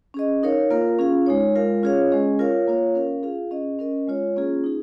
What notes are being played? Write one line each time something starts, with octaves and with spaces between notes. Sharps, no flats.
C#4 G#4 D#5
D#4 A#4 C#5 F5
A#3 F4 A#4 F5
C#4 F4 G#4 F5
G#3 D#4 C#5
G#3 F4 A#4 F5
C#4 F4 G#4 C#5 F5
G#3 C#4 G#4 D#5
F4 A#4 C#5 F5
A#3 F4 C#5 F5
C#4 A#4 F5
F4 G#4 F5
C#4 G#4 D#5
C#4 A#4 D#5
G#3 F4 C#5
A#3 C#4 F4 G#4
D#4 G#4